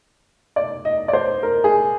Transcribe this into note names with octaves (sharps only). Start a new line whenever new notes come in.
D5
D#5
D5
C5
A#4
G#4